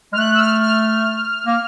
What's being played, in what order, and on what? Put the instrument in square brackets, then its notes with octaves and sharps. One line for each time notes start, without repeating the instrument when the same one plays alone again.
[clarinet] G#3 [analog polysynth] F6
[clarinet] A3 [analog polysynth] F#6
[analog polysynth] E6
F6
F6
[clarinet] A#3